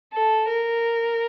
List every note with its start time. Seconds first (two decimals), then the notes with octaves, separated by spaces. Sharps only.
0.12 A4
0.48 A#4